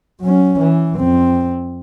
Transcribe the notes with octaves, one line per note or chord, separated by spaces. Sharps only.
F#3 C#4
E3
F2 C4